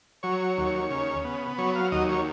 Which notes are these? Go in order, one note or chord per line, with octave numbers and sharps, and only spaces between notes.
F#3 C#5
D#2
C#3
B3
F#3 C#5
F5
D#2 D#5
C#5